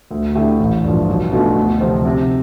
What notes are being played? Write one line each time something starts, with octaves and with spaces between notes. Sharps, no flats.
D2
D3 A3 E4 G4
A1
G2 F3
B1
B2 A3 D4 F4
D2
C3 F3 C4 F4
C3